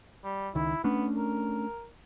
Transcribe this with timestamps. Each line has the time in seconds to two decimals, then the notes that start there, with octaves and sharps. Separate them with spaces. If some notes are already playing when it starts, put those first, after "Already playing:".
0.24 G3
0.55 C#2 D#3 E4
0.84 A3 B3 C#4 D4
1.17 A#4